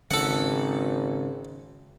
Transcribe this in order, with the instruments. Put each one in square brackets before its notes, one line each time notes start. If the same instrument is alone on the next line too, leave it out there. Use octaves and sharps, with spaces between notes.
[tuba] G#1 [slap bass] C#3 [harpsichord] A4 F#5